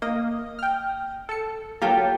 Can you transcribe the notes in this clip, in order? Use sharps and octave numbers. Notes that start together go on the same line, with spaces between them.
A#3 D#5
G5 F6
A4 C#7
F#3 A#3 F4 G4 A4